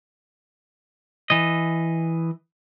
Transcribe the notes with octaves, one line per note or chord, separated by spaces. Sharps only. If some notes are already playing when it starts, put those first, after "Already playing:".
E3 D#5